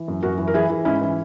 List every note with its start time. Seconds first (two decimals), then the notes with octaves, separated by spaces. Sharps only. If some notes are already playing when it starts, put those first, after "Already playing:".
Already playing: E3
0.08 F#2
0.22 F#2 F#4 A#4
0.38 E3
0.48 A#4
0.54 E3 E4 G#4
0.70 E3
0.85 G#2 C#4 E4
1.02 E3